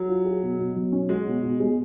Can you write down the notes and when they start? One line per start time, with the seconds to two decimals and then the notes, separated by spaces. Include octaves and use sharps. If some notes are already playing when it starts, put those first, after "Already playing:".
Already playing: F#3
0.08 F4
0.25 G#4
0.42 B2
0.59 B2
0.76 F#3
0.92 C#4
1.09 G#3 F#4
1.27 B2
1.43 B2
1.60 G#3